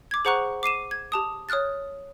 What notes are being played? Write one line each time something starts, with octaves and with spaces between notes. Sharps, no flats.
D6 G#6
G#4 C5 F#5 A#5 C#6 F#6
D6 C7 D#7 E7
G#6
G4 A5 D#6
C#5 D#6 F6 F#6 A6